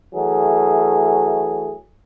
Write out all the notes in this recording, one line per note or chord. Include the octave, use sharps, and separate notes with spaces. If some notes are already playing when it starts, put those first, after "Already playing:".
E3 F#3 A3 G#4